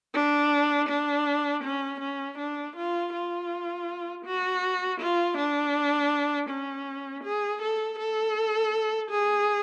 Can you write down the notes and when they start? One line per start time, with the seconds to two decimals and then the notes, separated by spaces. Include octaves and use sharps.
0.14 D4
0.89 D4
1.63 C#4
2.01 C#4
2.38 D4
2.76 F4
3.13 F4
4.25 F#4
5.00 F4
5.38 D4
6.49 C#4
7.24 G#4
7.62 A4
7.99 A4
9.11 G#4